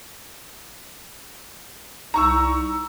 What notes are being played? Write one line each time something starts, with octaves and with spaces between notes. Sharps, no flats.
C2 D#4 A#5 C#6 E6